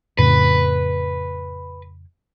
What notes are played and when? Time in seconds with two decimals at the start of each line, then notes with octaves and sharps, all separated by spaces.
0.19 F2 A2 C#3 B4